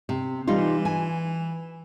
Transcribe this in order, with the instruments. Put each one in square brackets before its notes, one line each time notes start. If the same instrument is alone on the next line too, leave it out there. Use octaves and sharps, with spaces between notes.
[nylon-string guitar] C3
[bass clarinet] E3 [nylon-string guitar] G3 D#4 F4
[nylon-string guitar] G#5